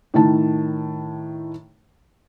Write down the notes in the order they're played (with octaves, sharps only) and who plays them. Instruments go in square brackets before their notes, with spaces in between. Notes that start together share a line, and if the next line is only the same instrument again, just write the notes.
[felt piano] A2 D#3 A5